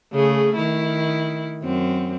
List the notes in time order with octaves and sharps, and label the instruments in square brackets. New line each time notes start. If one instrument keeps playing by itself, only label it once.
[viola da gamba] C#3 A3 G#4
D#3 E4
F#2 C4